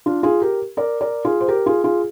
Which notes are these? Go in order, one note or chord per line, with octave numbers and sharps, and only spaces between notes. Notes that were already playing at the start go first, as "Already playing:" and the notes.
D4 F4
F4 G#4
G4 A#4
A#4 D5
A#4 D5
F4 G#4
C5
G4 A#4
F4 G#4
F4 G#4